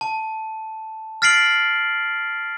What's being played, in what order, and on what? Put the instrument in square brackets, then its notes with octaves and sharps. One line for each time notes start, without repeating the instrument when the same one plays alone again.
[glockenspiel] A5
F6 A6 B6 C7 D7 F#7